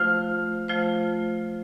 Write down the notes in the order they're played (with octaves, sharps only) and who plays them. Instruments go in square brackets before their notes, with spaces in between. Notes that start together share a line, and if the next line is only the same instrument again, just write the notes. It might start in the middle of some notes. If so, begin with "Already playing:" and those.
Already playing: [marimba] F3 A3 F4 C5 [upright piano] F6
[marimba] F3 A3 F4 C5